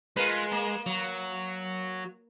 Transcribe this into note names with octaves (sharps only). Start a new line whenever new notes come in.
G#3 F4 A#4 B4
A#3
F#3